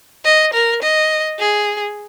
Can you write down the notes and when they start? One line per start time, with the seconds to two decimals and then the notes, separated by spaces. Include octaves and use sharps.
0.25 D#5
0.53 A#4
0.82 D#5
1.39 G#4